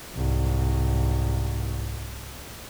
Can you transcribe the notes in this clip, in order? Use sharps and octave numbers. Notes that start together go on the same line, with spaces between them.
C2 G#2